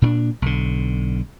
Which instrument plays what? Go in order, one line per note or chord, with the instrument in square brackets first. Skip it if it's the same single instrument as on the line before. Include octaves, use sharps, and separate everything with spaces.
[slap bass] A#2 C4 D4
B1 D3